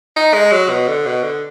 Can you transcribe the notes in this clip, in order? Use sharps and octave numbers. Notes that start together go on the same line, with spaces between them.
D#4
G#3
F#3
B2
D3
B2
D3